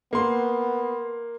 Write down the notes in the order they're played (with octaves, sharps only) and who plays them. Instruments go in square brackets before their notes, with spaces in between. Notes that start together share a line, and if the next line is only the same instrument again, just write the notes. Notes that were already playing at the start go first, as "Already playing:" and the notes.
[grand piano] A#3 C6 [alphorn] B3